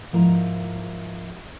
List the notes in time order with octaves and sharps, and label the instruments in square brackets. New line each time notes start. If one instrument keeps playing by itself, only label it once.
[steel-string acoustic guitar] G#2 F3 E4 A#4 C5 A#5